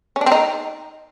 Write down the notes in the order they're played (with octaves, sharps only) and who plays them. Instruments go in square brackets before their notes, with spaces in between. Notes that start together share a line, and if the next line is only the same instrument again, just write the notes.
[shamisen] C#4
D4
C4
D#4